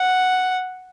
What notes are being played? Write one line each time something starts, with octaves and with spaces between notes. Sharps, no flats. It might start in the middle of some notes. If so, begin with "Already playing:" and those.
Already playing: F#5